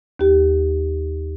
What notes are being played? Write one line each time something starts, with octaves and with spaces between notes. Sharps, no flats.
D#2 G4